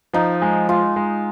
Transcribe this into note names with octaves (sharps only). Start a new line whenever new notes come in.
F3 D#4
G#3
G#3 F4
G#3